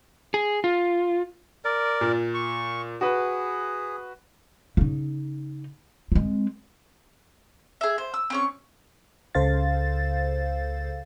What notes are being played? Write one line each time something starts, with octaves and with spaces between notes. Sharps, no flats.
G#4
F4
A#4 D5
A#2
C#6
F#4 G#4 B4
C#3 D#4
G#3 C4
G#4 E5
C5
E6
C4 C#4 C#6
C#2 C#3 A4 C5 F5 A6